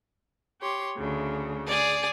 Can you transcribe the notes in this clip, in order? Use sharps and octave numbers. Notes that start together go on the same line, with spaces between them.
G4 C#5 C6
D2 C#3
G#4 D5